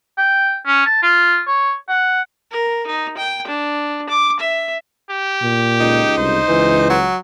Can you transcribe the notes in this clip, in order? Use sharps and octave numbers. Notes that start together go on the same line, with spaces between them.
G5
C#4
A5
F4
C#5
F#5
A#4
D#4
G5
D4
D6
E5
G4
A#2
C#2 D#4
C2 C5
C#2 E3
F#3